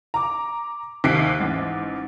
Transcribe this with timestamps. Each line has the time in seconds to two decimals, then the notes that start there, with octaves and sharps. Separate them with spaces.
0.14 A#5 D6
1.04 D#2 C3 F#6 B6 C7 D7
1.40 A1 G#2